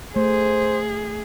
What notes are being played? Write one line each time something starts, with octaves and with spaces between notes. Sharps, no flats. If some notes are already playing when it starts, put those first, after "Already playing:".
A3 G#4 C5